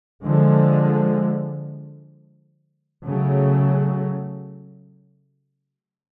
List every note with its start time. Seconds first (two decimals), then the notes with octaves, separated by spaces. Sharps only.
0.25 D3 F3 G#3
3.06 C#3 F#3 A3